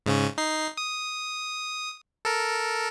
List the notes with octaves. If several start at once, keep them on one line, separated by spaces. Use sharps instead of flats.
G#2 C#3 C#4
D#4 C7
D#6
A4 A#4